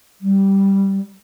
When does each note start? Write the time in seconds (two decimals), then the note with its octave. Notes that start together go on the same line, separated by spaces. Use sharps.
0.21 G3